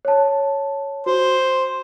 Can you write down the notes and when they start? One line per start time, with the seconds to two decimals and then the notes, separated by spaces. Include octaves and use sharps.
0.05 C#5 A5
1.06 F#4 C5